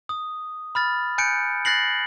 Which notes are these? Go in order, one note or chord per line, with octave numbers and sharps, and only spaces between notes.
D#6
B5 F6 A6
G#5 F#6 G6 C#7 D7
F#6 A6 A#6 C7 F#7